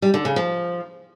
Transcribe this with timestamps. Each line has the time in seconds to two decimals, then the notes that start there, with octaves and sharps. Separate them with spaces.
0.02 G3
0.14 D3
0.25 C#3
0.36 F3